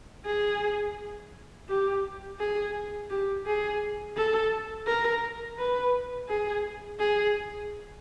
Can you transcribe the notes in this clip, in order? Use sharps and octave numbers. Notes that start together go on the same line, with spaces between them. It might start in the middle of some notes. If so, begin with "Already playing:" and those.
G#4
G4
G#4
G4
G#4
A4
A#4
B4
G#4
G#4